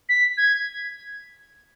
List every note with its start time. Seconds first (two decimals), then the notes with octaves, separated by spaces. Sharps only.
0.09 B6
0.38 G#6